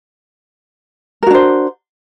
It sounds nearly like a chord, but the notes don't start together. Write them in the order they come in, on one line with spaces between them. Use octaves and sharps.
A#4 F#4 D4 C5